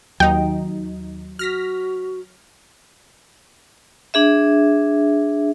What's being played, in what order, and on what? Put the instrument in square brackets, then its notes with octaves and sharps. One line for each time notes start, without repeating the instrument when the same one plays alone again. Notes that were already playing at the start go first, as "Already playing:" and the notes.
[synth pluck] D#2 D#4 [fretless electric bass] F#3 [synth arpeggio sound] G5
[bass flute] F#4 [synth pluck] F6 A#6 B6
[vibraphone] D4 G#4 E5